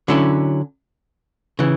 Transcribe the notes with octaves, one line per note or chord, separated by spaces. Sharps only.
D3 F#3 C#4 E4
C#3 E3